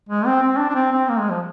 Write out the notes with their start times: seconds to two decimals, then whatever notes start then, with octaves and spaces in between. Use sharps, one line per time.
0.09 G#3
0.26 C4
0.42 C4
0.58 D4
0.69 D4
0.75 C4
0.92 C4
1.09 A#3
1.19 G#3
1.30 F3